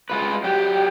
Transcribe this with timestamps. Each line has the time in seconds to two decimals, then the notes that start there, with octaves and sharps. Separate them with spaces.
0.10 G#3 F4 B4
0.44 F#3 G4